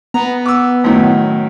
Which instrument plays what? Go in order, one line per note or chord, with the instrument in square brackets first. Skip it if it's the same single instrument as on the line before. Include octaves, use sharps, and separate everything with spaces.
[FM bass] B3 [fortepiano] A#5
[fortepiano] D6 E6
F#2 A2 D#3